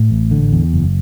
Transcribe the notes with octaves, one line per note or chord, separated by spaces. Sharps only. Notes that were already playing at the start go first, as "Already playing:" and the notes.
Already playing: A2
A1
D3
E2
F#1